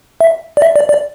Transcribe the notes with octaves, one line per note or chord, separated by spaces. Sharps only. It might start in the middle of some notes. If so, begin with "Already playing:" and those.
E5
D5
E5
D5
D5